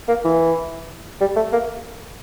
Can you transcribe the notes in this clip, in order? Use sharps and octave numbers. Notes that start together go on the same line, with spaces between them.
A#3
E3
G3
A3
A#3